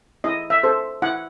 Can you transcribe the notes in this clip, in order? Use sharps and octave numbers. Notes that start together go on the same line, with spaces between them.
E4 D#5
E5
A4 C5
E4 F#5